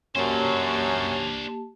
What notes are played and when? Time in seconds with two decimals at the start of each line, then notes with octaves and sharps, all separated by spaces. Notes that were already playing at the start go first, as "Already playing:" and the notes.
0.16 F#2 A#3 C#4 D4 G4 C5 A5